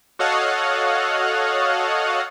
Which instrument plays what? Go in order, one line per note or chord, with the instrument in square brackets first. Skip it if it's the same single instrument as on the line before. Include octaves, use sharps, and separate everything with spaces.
[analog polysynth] F#4 A4 C#5 D#5 F5 F#5